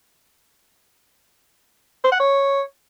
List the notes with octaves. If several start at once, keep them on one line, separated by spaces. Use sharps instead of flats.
C5
F#5
C#5